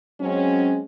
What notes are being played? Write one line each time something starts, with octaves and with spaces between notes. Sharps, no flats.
F#3 G#3 C4 C#4